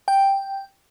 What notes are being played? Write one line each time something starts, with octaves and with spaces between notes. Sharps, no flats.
G5